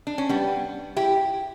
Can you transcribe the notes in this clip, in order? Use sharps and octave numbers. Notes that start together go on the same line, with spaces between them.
D4
C#4
G3 B3
E4 G4